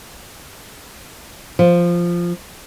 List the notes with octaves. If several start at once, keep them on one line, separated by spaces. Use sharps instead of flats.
F3